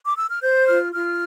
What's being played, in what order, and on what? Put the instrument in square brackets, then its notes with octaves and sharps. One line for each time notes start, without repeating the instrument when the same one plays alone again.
[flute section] D6
E6
F6
C5 G6
F4 F6
F4 F6